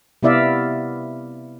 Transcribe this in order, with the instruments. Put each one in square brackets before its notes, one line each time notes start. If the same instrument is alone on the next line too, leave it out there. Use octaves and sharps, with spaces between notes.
[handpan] C3 B3 E4 D5 E5 F5